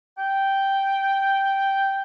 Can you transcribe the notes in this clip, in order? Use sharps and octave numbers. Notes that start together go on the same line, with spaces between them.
G5